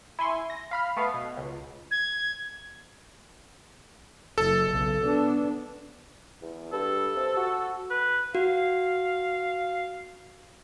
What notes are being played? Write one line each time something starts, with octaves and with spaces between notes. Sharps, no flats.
E4 G#5 C6 C#6
A#6
F5 B5 F6
A3 B3 F5
B2
C#2
G#6
F#1 A4
B1 C#3
B3 D4
E2
G2 A4
C3
F#4
B4
F#4 F5